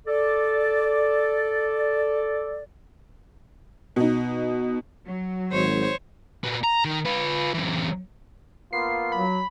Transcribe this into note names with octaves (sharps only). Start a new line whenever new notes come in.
A4 D5
B2 D#4
F#3
G#1 C5 C#5
A#2 B3
A#5
D#3
F4 B4
F#2 E3
A#3 B3 F4 C7
F#3 B5